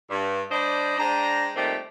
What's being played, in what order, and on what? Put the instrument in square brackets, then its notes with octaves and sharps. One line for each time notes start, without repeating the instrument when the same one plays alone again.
[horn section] G2
G3 D4 C5 D5 D#5
G#3 D4 C5 G5 A#5
A#2 D#3 G3 A3 C4 G4